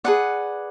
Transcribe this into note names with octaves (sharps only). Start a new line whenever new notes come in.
G#4 B4 D5 F#5